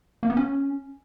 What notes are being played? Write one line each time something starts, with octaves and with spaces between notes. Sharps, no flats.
A#3
B3
C#4